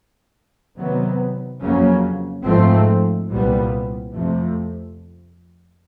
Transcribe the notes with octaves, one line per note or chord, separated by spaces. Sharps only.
C3 D#3 F#3 B3
F2 C#3 F#3 A#3 C#4
G#2 F3 A3 C4
C2 A#2 G3 B3
F2 C3 F3 A3